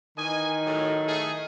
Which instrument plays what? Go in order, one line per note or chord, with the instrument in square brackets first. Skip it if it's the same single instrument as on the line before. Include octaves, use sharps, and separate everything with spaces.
[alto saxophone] D#3 [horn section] E3 D#5 G#5
[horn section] A2 F#3
A3 G#4